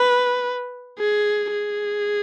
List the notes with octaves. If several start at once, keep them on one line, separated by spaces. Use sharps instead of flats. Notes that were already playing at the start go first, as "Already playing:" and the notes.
Already playing: B4
G#4
G#4